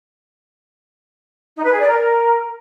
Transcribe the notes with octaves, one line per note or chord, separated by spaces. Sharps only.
D#4
B4
G#4
D5
A#4